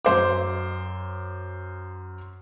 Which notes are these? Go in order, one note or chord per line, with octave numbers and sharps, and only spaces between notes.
F#2 C5 D6